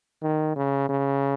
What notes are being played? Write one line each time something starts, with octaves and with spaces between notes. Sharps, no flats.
D#3
C#3
C#3